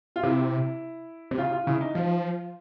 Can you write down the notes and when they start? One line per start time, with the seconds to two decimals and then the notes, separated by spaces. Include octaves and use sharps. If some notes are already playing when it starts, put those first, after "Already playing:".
0.16 F4
0.23 C3 E4
1.31 C3
1.38 C#3 F4
1.53 F4
1.67 C#3 E4
1.81 D#4
1.95 F3 F4